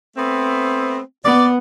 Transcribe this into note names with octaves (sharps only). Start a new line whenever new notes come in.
A3 B3 C4
B3 D5